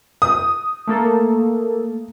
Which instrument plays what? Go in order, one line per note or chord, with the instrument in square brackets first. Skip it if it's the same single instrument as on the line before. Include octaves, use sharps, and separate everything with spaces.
[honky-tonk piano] D#6
[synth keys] A3 A#3 A4